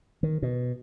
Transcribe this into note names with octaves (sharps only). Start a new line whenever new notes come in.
D#3
B2